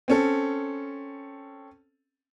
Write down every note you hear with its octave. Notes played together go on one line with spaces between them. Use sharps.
C4 C#4 A4